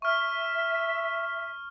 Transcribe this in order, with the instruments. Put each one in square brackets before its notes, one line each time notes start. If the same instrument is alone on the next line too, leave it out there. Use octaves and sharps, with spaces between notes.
[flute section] E5 [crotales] C#6 F6